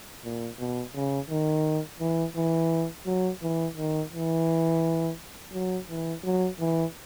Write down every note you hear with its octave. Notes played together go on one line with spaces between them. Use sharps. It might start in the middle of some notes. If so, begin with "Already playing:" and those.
A#2
B2
C#3
D#3
E3
E3
F#3
E3
D#3
E3
F#3
E3
F#3
E3